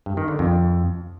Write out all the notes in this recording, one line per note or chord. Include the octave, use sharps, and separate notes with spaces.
G2
D#3
D3
F2